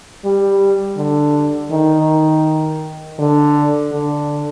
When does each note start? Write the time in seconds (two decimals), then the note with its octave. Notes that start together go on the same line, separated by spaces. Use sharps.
0.25 G3
0.97 D3
1.71 D#3
3.19 D3
3.92 D3